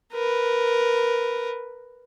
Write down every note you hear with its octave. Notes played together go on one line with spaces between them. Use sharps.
A#4 B4